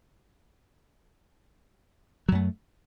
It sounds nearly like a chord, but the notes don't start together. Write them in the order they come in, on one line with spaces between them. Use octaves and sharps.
F#3 F#2 A3